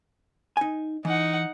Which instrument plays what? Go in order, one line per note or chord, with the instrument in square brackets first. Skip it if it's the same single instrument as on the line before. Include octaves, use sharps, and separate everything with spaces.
[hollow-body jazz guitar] D#4 G#5
[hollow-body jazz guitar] E3 [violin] D#4 F#5